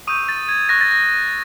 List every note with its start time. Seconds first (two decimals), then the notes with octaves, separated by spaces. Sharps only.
0.07 C#6 D#6 E6 G6 D#7
0.29 A6
0.49 G#6
0.69 C#6 F#6 A#6
0.81 A6
0.91 A#6